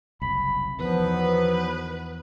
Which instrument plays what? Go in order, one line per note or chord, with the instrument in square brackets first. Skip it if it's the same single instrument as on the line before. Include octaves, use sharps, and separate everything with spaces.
[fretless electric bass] F#1 C2 [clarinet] B5
[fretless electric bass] E2 [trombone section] D#3 F#3 B3 [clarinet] F3 [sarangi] B4